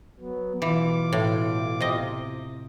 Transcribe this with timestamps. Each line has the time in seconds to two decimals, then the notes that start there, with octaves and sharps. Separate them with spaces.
0.20 F#3 B3
0.62 B2 E3 F4 D6
1.13 A2
1.81 C3 D#5